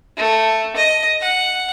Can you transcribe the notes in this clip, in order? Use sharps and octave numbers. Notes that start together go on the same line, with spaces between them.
A3
D#5
F#5